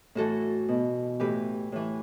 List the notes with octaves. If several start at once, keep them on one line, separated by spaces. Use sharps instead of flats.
A2 E3 F#4 A4
B2
A2 E3 G4 B4
A2 E3